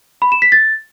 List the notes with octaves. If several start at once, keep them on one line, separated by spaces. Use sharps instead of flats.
B5
E7
B6
A6